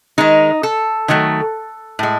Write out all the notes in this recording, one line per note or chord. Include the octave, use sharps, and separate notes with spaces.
D#3 G#3 D#4
A4
D#3 F#3 A3
A2 G#3